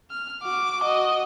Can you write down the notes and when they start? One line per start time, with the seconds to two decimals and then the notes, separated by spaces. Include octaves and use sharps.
0.11 F6
0.43 F#4 D6
0.84 F#4 D#5